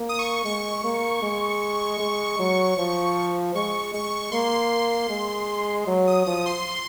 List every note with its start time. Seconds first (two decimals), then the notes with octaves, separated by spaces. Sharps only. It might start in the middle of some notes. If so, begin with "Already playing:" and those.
Already playing: A#3
0.09 D#6
0.19 C#6
0.45 G#3 C#6
0.84 A#3
1.22 G#3
2.00 G#3
2.39 F#3
2.77 F3
3.55 G#3 C#6
3.94 G#3 C#6
4.32 A#3 C6
5.09 G#3
5.87 F#3
6.07 D#6
6.26 F3 D#6
6.46 C6